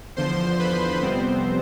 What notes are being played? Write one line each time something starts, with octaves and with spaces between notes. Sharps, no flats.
E2 D3 F3 C5 C6
B4 B5
F2 C3 G3 B3 C4 C5